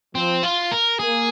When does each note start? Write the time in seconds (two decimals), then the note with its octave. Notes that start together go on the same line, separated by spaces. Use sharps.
0.15 F3 C4
0.43 F4
0.72 A#4
0.99 A#3 G#4